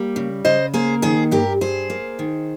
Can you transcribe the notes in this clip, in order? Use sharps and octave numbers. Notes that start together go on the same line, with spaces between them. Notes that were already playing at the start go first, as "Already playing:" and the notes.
Already playing: G3 A#3
C#3
C#3 C5 D#5
A#3 G#4 C5
D#3 G#4 C5
G2 G4 A#4
G2 G#4 C5
A#3
D#3